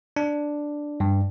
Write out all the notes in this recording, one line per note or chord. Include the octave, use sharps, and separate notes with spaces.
D4
G2